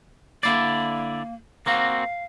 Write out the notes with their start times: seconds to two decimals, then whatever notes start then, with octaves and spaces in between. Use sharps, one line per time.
0.43 D3 A#3 E4 D5
1.66 A#3 C4 F#4 F5